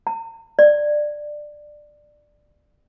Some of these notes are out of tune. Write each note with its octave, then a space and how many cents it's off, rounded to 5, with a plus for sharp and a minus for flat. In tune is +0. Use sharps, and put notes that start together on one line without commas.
A#5 -45
D5 +15